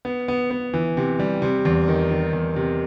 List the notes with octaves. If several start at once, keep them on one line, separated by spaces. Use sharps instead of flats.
B3
B3
B3
E3
C3
G3
C3
E2
D#3
D#3
E2
C3